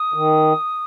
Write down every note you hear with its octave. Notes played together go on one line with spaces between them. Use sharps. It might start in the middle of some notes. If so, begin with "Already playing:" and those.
Already playing: D#6
D#3